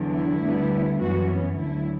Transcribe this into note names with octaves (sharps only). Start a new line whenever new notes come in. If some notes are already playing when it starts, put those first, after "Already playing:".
Already playing: E2 D3 F#3
E4
D2 D3 G3 B3
F#2 E3 B3 F#4
C#4
D2 D3 F#3 A3 E4